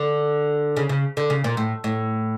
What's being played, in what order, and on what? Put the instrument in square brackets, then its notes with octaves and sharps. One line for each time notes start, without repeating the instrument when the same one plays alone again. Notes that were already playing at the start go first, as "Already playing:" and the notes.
Already playing: [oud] D3
C#3
C#3
D3
C#3
A#2
A2
A2